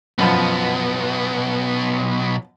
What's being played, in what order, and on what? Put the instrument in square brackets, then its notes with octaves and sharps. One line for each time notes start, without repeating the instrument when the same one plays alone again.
[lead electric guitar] B1 B3 [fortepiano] F#2 B2 F3